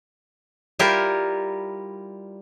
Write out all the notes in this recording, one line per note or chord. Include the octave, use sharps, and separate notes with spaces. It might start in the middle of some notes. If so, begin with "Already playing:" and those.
G3 E4 F4 G4 A#4